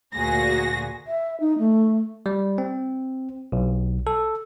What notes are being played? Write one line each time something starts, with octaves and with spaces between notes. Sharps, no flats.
D2 A#2 F#4 G#4 A#6
E5
D#4
A3
G3
C4
B1
A4